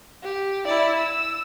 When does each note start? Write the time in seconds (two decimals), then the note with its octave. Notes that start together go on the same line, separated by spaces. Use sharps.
0.23 G4
0.65 E4 D5
0.96 E6